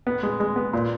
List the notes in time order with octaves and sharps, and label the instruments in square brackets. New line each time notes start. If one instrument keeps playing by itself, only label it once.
[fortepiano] B3
G#3
G#3
B3
A#2